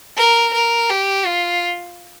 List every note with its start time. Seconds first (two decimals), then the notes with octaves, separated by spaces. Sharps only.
0.17 A#4
0.54 A#4
0.90 G4
1.26 F4